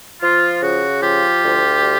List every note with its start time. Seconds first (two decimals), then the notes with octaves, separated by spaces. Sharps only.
0.22 F3 F4
0.62 C#3 F#4
1.02 F3 F4 G4
1.42 D2
1.83 G3